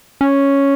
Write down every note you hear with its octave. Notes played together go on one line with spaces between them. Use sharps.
C#4